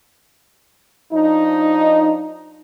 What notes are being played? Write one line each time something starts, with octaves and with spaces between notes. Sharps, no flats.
F3 D4 D#4